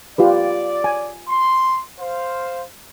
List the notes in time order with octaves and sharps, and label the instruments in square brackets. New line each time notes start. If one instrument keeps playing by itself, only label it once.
[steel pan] F4 G4 B4 [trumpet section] D5
[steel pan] G#5
[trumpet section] C6
C5 F5